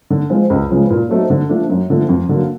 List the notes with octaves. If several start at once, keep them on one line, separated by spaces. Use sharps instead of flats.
D3
F3 G#3 C4 F4
C#2
C#3 F3 G#3 B3
A#2
F#3 A3 C4 D#4
D3
F3 A3 D4
F#2
D3 F3 A3
F2
D3 F#3 A#3